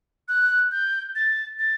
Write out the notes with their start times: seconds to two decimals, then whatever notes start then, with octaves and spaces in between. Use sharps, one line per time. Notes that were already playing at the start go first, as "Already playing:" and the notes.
0.28 F#6
0.72 G6
1.15 A6
1.59 A6